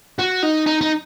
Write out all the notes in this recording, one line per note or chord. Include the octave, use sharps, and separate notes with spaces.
F#4
D#4
D#4
D#4